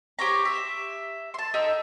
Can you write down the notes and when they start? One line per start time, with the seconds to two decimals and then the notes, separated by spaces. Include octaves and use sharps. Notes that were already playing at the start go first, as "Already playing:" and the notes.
0.19 G4 C5 C#5 A#5
0.45 E5
1.34 A5 C6
1.54 D#4 A4 E5 G5